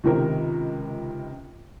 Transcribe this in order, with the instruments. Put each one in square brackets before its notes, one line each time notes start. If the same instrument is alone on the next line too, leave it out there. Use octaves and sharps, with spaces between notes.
[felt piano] C#2 C3 D#3 A#4